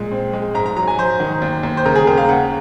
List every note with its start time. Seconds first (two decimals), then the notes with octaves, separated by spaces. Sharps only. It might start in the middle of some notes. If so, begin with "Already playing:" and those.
Already playing: A#2 G#3
0.11 C4
0.33 G#3
0.55 G#2 A#5
0.66 A#5
0.77 F#3 A#5
0.88 G#5
0.99 F#3 C5
1.20 D#3
1.42 D#2
1.63 D#2
1.77 C5
1.85 C#3 A#4
1.96 G#4
2.07 D#2 A#4
2.18 F5
2.29 C#3 F#5